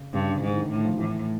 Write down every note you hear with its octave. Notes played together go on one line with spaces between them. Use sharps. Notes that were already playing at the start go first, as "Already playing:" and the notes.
Already playing: C#3
G2 C#3
D3
G#2 D#3
D3
D#3
A2
F3
A2 E3